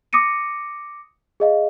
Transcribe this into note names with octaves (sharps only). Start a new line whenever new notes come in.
D6 D#6 A#6 C#7 D#7
G#4 D#5 F5